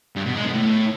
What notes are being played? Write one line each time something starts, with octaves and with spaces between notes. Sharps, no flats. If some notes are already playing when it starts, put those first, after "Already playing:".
G2
B2
G#3
B2
A2